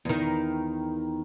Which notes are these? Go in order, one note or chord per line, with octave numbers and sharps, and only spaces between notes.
E2 D#3